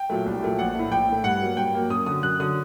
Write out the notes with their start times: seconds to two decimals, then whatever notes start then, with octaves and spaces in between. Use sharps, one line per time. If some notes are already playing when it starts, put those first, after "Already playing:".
Already playing: G5
0.09 A#2 F#3 A3
0.26 C2
0.43 A#2 F#3 A3
0.59 A#1 F#5
0.75 A2 A3
0.91 A#1 G5
1.08 A2 A3
1.24 G2 F#5
1.41 F#3 A#3
1.57 G2 G5
1.74 F#3 A#3
1.90 F#2 D#6
2.06 D3 F#3 D#6
2.23 F#2 F#6
2.40 D3 F#3 D#6